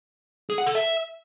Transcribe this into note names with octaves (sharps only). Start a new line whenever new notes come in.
G#4
F#5
A4
E5